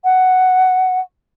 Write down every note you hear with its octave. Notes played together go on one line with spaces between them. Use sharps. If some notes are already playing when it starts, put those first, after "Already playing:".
F#5